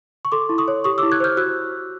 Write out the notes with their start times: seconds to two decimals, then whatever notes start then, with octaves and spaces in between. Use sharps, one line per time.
0.25 C#6
0.32 A4 C6 D6
0.49 E4
0.58 C#6 D#6
0.68 C#5
0.84 G4 C#6 D#6
0.98 E4 D6 E6
1.12 F#6 G#6
1.20 C5 F6 G6
1.37 F#4 E6 F#6